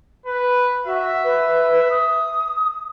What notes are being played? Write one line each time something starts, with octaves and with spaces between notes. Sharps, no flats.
B4
F#4 E5
B4
D#6